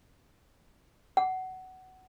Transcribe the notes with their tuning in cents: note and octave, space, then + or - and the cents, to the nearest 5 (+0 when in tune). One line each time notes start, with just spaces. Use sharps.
F#5 +15